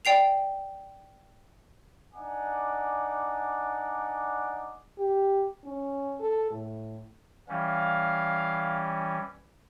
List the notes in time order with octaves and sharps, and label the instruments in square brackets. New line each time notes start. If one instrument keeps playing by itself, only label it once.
[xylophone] D5 G5 C7 F7
[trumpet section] D4 D#4 D5 F#5 G#5 D6
[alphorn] G4
C#4
A4
A2
[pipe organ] E3 G3 C#4 [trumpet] F5